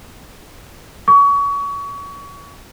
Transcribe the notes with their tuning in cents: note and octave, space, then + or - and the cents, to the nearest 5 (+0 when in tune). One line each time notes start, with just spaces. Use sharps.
C#6 +30